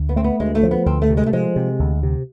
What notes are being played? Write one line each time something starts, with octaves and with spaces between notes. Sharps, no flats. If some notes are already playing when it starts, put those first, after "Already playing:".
Already playing: D2
B3
A3 C4
B3
D2 G#3
A3
F3
B3
D2 C4
A3
C3
G#3
A3
F3 G#3
C3
D2
C3